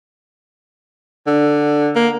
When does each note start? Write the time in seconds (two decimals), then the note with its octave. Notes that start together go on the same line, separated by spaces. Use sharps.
1.27 D3
1.95 A#3